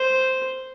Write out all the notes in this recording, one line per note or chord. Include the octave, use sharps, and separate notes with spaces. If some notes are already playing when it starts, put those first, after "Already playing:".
Already playing: C5